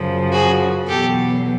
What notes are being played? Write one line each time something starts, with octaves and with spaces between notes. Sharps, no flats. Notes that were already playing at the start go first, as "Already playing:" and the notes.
Already playing: F#2 C#3 F3
F#4 G#4
E2 B2 F#3 G4 A4